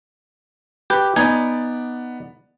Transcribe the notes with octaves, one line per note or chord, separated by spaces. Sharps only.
G4 B4
B3 D#4 D5 G#5